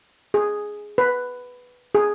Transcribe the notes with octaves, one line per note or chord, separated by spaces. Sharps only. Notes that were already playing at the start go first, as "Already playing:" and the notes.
G#4
B4
G#4